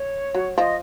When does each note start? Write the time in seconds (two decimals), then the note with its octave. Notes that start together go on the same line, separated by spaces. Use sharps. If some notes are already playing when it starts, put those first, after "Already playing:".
Already playing: C#5
0.35 F#3
0.57 F3 D#5